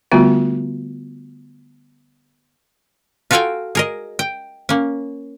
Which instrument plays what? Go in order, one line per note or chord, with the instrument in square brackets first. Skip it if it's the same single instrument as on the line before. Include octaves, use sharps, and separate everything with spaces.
[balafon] D3 G3 A3 B3 F4 F#4
[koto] F4 F#4 A4 F5 G5 G#5
G#4 A#4 D#5
G5
A#3 C#4